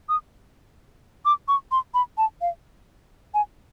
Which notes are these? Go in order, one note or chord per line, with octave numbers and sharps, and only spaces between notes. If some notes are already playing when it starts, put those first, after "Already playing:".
D#6
D6
C#6
C6
B5
A5
F5
G#5